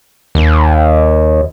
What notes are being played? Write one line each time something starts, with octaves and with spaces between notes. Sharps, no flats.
D#2